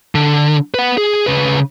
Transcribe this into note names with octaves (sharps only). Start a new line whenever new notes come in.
D3
B4 F#5
G#4
C#3 B4